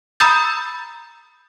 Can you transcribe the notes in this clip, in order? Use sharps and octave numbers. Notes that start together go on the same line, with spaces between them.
A#5 B5 D#6 E6 G6 A6